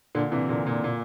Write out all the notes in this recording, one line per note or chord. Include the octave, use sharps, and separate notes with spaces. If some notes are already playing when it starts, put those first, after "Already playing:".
A#2 D3
C3 E3
A#2 D3
A#2
A#2